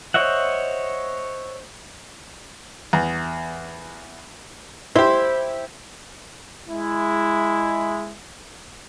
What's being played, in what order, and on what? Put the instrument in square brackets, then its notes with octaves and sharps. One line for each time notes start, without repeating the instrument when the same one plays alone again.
[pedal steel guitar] C5 C#5 D#5 E5 F#5
[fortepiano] E2
[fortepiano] E4 G4 [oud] C5
[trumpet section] G#3 E4